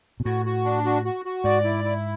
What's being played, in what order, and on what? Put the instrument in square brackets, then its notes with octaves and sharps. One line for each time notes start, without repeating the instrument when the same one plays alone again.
[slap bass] B2
[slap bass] A2 [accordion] F#4
[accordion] F#4
D4
F#4
F#4
F#4
[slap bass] G#2 [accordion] D5
[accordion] E4
E4